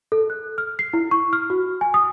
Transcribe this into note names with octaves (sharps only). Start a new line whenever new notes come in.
A4
F#6
F6
C7
E4
C#6
F6
F#4
G#5
D#6